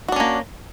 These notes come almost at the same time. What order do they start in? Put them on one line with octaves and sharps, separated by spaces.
F#4 D4 C#4 A#3